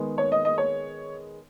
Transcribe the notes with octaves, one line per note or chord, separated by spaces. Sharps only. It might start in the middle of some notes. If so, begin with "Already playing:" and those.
Already playing: D#3 G#3 B3
C#5
D#5
D#5
C#5